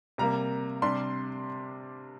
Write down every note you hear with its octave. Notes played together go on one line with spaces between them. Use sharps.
C3 G3 A#3 A#5
C3 G3 D4 C6